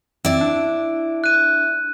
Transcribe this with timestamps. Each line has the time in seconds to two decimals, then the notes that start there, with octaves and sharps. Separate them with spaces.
0.25 C4 E4 D5
0.41 D4
1.24 F#6 D#7